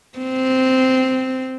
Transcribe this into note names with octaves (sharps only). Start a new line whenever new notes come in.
C4